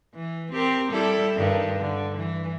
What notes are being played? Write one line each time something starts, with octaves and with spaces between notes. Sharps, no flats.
E3
C4 G4 A#4
G3 E4 A4
G2 D#3
D3
E3